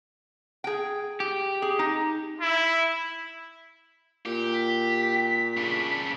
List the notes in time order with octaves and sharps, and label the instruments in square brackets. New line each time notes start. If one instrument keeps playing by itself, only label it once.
[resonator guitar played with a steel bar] G#4 G5
[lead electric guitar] G4
[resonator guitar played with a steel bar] G#4
D#4
[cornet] E4
[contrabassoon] A#2 [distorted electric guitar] G4
[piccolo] B6
[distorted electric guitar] C#3 D4